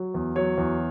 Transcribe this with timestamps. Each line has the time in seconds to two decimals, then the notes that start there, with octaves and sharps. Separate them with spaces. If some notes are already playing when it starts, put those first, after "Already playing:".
Already playing: F#3
0.14 E2
0.36 F#3 C#5
0.58 E2